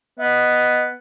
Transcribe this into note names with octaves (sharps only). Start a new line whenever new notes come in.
B3 D#5